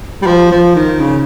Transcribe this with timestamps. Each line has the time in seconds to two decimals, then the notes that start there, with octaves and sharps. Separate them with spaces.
0.22 G3
0.27 F3
0.51 F3
0.76 D#3
1.00 C#3